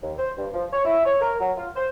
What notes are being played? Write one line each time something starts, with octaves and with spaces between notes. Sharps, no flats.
D#2
C5
G2
F3
C#5
E4
C#5
A#4
F#3
F4
C5